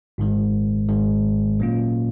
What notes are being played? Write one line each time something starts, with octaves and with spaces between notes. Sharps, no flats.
G#1 G#2 D#3 G#3
G#1 G#2 D#3 G#3
A#2 F#3 A#3 C#4 F4